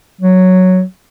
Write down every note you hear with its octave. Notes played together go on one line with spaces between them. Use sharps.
F#3